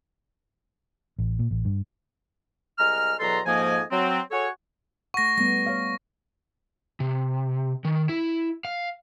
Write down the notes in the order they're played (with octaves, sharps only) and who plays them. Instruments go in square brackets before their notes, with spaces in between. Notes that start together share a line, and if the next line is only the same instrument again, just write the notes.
[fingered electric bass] A1
A#2
A1
G2
[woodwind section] C2 G#3 A#5 F6
E2 B2 F#3 A4 A#5 C6
F2 G#2 F3 A#3 D#5 G#5
F#3 C4
F#4 G#4 A4 C#5
[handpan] A3 F#5 [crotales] C#6 A#6
[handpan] G3 A3 B3 [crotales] A#6
[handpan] C#5 F5
[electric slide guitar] C3
D#3
E4
F5